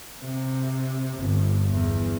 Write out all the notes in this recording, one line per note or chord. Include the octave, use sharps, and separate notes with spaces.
C3
G1
E2